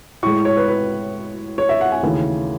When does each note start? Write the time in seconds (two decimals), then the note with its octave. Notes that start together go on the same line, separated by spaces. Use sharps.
0.23 A2 G#3 C#6
0.45 C#5
0.57 B4
0.68 B4
1.58 C#5
1.69 E5
1.81 F#5
1.92 G#5
2.03 D#2 C#3 E3 A3